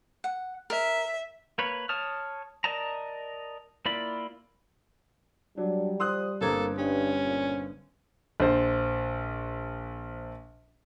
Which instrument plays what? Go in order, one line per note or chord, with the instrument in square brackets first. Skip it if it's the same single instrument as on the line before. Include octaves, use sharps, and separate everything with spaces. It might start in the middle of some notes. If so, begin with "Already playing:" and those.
[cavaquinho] F#5
[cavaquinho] A#4 [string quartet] E5
[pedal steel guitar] A#3 B4 C#5
C#5 A5 D#6 F6
A#4 D5 D#5 A5 A#5
A#3 E4 F4 D5 B5
[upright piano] F#3 [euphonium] G3 [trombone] D4
[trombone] F3 [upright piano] C6 D#6 F#6
[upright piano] G1 C4 G#6 [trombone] A#3 [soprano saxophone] A4
[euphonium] G2 [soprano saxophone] C#4 [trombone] G4
[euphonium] A#2
[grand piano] A#1 C5